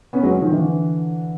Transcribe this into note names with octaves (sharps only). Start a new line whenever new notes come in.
B3 C#4
F#3 G#3
D#3 F3
D3 E3